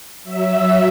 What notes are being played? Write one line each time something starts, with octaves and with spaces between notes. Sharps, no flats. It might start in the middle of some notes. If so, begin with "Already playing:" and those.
F#3 E5